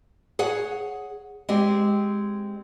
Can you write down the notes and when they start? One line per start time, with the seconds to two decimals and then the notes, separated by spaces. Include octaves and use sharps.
0.39 G#4 C#5 F#5
1.49 G#3 C4 G4